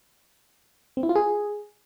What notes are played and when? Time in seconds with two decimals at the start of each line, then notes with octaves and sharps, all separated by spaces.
0.97 C4
1.03 E4
1.09 F4
1.15 G#4